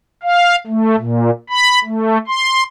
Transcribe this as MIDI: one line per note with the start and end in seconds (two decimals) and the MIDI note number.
0.23 0.56 77
0.67 0.96 57
0.97 1.30 46
1.50 1.79 83
1.84 2.18 57
2.28 2.64 84